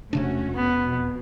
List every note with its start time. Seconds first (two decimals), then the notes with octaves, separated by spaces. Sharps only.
0.13 E1 C3 A3 C#4 D4 F#4
0.55 B3
0.84 F2 B2